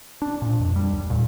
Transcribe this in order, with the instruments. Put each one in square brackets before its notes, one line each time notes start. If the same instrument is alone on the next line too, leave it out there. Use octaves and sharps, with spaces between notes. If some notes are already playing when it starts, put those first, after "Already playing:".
[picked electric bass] D4
A#2
F2
G3
D#2
A#2